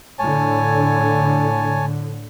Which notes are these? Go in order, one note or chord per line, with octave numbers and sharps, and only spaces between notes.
A2 D3 C#5 G#5 A5